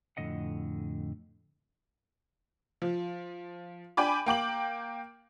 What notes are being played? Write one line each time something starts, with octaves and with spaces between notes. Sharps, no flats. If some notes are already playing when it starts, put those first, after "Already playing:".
F2 A2 D3 D#5 F#5
F3
D4 G5 G#5 B5 D6
A#3 G5 D6 F#7